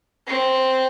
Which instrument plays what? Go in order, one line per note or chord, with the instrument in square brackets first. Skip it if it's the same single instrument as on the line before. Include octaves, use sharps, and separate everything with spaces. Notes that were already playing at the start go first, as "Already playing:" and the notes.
[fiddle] C4